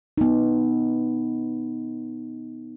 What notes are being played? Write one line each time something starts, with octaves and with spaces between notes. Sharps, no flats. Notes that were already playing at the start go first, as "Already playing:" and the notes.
B3 D#4